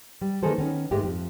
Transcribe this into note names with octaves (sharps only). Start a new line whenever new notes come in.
G3
D#3 E3 A#3 G#4 A4 C5
D#3 B3 C#4
G#2 G#3 A3 G4
F2